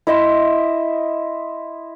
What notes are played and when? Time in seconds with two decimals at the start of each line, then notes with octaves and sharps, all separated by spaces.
0.07 E4 D#5 E5 C6